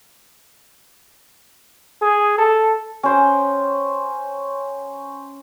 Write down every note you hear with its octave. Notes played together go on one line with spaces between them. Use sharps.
G#4
A4
C#4 C5 G5